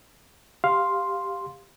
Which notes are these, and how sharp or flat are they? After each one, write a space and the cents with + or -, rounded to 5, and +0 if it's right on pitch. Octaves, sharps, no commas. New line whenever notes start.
G4 +0 F5 +0 C6 +0